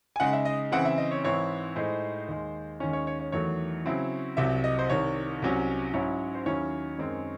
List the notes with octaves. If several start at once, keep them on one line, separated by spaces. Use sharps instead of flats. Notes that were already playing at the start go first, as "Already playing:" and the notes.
G#5
C#3 G#3 D#4 F#5
E5
D#5
C#3 E3 C4 E4 F#5
E5
D#5
C#5
G#2 E3 C4 E4 C#5
A2 G#3 D#4 C5
D#2 D#3 G#3
D#2 D#3 G#3 C#4 C#5
C#5
C#5
C#5
E2 D#3 F#3 A3 C#5
C#3 F#3 C4 E4
C2 C3 F#3 E5
D#5
C5
C2 C3 D#3 C#5
C2 C3 F#3 C#4
G#2 F#3 C#4 E4 C#5
C5
D#2 D#3 F#3 C#4 E4 C#5
F#2 D#3 G#3 C4